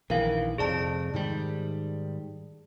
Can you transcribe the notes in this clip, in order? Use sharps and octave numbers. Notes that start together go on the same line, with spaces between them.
A#1 D#3 E3 A#4 F5
F1 F2 G#4 D5 A5
G#2 D#3 G3